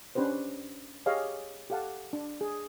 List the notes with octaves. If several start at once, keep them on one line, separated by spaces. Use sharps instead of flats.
C#4 D4 G4 B4 C5
G4 G#4 C#5 D#5 F5 G#5
G4 A4 F5 F#5 A5
D4
G#4